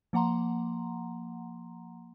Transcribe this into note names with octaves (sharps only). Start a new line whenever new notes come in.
F3 A#3 F#5 A#5 C6